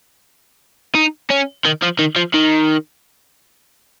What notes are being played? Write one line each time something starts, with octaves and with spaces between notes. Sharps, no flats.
D#4
C#4
D#3
F3
D#3
F3
D#3